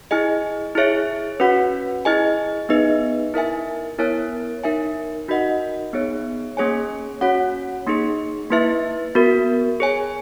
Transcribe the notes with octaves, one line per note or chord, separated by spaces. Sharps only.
E4 G#4 D#5 G#5
E4 G#4 C#5 E5
C#4 F#4 B4 F#5
E4 G#4 D#5 G#5
B3 D#4 G#4 B4 D#5
E4 A#4 E5 G#5
B3 E4 A#4 C#5 G#5
D#4 A#4 E5 G#5
D#4 F#4 A#4 D#5 F#5
B3 D#4 G#4 C#5
A#3 C#4 G#4 C#5 G#5
C#4 F#4 C#5 F#5
A#3 D#4 G#4
A#3 E4 B4 E5
B3 F#4 A#4
G#4 C#5 G#5